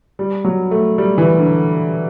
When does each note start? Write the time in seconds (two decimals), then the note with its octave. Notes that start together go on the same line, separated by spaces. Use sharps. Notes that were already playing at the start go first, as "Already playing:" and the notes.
0.19 G3
0.44 F#3
0.71 A3
0.98 G3
1.18 E3
1.38 D3